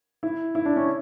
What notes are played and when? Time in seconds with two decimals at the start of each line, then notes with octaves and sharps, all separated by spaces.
0.23 E4
0.55 E4
0.65 D4
0.76 C#4